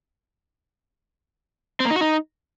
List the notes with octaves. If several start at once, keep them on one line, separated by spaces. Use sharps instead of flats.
C4
A#3
D#4
F#4
D#4